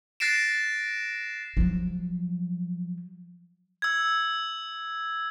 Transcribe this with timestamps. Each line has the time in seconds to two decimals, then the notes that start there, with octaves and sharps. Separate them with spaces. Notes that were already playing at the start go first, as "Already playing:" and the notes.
0.20 F#6 A6 A#6 C7 D7 E7
1.57 F3 F#3
3.82 E6 G#6